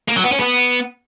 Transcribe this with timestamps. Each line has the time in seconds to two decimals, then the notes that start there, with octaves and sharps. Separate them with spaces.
0.08 A#3
0.16 F#3
0.24 B3
0.32 C#4
0.40 B3